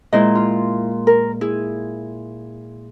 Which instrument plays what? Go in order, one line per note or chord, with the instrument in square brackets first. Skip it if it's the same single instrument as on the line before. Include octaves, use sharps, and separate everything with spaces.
[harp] A#2 G#3 [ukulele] E4 C5 D#5
[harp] F4
[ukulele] A#4
[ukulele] E4 [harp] G#4